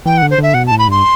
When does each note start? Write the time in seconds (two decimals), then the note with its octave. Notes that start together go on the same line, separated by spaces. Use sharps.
0.06 E3 G5
0.18 F#5
0.22 D3
0.30 C5
0.38 D3 E5
0.54 B2 F#5
0.67 A5
0.71 A2
0.79 B5
0.88 G2 C6